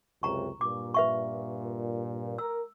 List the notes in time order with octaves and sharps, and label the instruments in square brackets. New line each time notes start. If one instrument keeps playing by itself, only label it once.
[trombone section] C#2 F#2 C3 [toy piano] A#5 C#6
[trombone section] G2 A#2 [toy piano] D6
[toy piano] B4 E5 C#6
[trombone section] A#4 [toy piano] E6